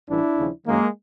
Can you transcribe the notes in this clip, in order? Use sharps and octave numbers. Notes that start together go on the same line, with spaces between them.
A1 G2 E3 D4 E4
D#2 C#3 F3
F#2 D#3 G#3 A#3